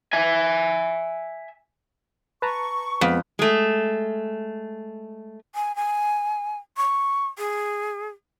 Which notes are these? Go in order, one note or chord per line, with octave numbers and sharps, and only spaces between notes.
E5 G#5
B4 A5 A#5 C#6
F2 G#3 B3
G#3 A3
G#5
G#5
C#6
G#4